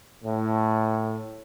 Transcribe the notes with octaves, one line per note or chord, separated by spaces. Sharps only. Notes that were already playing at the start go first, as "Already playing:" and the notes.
A2